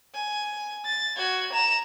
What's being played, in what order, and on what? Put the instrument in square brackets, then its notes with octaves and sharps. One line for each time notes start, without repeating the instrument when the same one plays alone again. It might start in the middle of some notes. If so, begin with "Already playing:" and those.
[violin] G#5
A6
F#4 G#6
A#5 E7